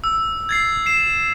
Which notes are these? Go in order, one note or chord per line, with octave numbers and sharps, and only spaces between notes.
E6
G#6 A6 C7
C7 E7